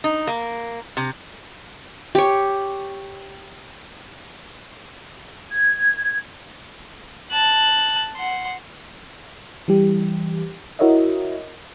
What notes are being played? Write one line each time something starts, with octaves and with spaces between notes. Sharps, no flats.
D#4
A#3
C3
G4 C#5
G#6
A5 F#6
F#5 C6
E3 G3 G4
E4 F#4 A#4 C#5 D#5 E5